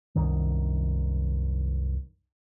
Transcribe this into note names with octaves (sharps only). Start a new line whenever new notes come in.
C2 F#2 D#3